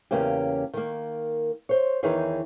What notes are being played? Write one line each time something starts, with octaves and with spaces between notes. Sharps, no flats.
E2 C#3 A#3 C#4 G4
D#3 A#3
C5 C#5
E2 D#3 E3 D#4 G#4 C#5